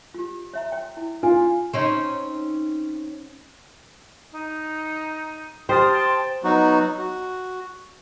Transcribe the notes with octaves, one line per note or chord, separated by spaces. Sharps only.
F4 G4
C#5 E5 A#5
C#5 G5
E4
F4 G#5
C4 C#4 D#4
D#4
G4 C5 A5 D#6 F6
G5 A5 C6
F#3 B3 D#4 F#4
F#4